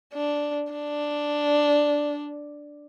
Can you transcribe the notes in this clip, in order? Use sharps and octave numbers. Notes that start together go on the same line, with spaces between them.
D4
D4